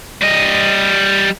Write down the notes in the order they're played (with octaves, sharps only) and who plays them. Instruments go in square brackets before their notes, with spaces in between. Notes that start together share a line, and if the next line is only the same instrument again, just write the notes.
[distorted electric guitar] G3 D#5